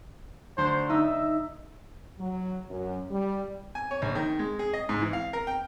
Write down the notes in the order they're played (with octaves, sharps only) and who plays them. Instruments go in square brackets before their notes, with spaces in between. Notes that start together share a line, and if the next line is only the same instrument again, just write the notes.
[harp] D2 [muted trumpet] C5
[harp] D#4 E6 [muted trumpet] E5
[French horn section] F#3
F#2
G3
[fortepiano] G#5
C#5
A#1
D#3
G#3
G#4
D#5
G#2
E3
F5
A#4
G5